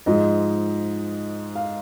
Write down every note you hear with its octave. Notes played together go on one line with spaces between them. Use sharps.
G#2 F3 G#3 D#5
F5